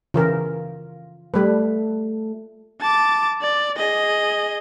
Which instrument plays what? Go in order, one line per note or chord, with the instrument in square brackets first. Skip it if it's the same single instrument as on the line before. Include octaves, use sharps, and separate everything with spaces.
[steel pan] C#3 E3 A#4 [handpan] F4
[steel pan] G3 B4 [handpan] A3 A4
[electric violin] A5 D6
D5
G#4 D#5